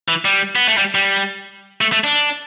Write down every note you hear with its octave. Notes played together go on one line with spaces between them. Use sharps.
E3
G3
B3
A3
G3
G3
A3
A3
D4